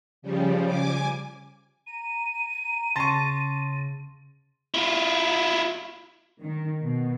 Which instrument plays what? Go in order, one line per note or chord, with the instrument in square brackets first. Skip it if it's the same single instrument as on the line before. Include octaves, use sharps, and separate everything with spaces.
[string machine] C#3 F3 G3
G#5 D6
[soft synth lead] A#5 [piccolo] D#7
[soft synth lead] C#3 [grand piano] A5 C#6 [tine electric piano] C6 A6 A#6
[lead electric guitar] E4 F4
[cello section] D#3
B2